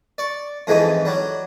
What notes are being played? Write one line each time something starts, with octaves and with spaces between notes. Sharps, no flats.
D5 C#6
F2 G#2 E3 G#3 A3 D#4
F#3 G3